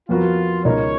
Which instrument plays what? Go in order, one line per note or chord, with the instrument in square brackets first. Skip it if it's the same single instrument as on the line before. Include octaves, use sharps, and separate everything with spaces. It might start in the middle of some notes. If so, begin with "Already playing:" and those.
[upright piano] F2 F3 B3 F#4 A#4 [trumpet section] F4
[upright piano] C#2 B2 G#3 D#4 A#4 [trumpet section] C#5